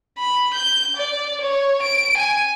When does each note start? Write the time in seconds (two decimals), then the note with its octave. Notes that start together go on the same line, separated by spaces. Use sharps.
0.18 B5
0.54 G6
0.97 D5
1.41 C#5
1.82 D7
2.17 G#5